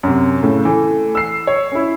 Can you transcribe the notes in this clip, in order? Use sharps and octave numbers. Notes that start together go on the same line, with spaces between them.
F#2 C3
A2 C#3
E3 A3
E6 C7
C#5
C#4 E4